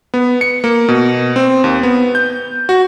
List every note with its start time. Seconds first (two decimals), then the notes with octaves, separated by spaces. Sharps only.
0.14 B3
0.41 C#7
0.64 A#3
0.88 B2
1.36 C4
1.64 D#2
1.83 B3
2.15 G6
2.69 F#4